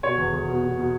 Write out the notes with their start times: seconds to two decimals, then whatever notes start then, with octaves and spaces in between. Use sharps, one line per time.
0.03 B2 C#5
0.18 E2
0.33 E2
0.48 B2
0.63 B2
0.77 B2